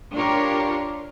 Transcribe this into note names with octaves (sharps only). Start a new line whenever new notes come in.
D4 F4 G4 A#4 C#5